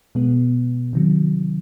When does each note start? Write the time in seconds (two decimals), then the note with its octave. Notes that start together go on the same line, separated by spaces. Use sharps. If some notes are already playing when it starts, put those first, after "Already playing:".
0.15 B2 G#3 B3
0.93 C3 D#3 F#3